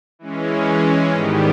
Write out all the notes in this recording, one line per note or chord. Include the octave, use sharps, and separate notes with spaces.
E3 G#3 C#4
G#2 D#3 G3 B3 G4